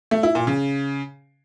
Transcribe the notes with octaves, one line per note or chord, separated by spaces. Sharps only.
A3
E4
A#2
C#3